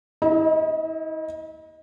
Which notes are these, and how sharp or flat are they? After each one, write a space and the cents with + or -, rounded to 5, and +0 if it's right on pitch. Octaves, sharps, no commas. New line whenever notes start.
E4 -40 D#5 +10